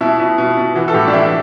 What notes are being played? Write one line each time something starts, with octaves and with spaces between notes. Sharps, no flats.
B2 E4
B2
B2
B2
E3 F#4
A4
A2 G4
D4
E3 E4